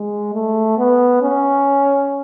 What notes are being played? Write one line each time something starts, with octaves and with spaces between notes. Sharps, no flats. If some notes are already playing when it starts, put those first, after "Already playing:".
Already playing: G#3
A3
B3
C#4